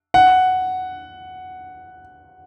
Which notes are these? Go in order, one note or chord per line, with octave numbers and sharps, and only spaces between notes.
F#5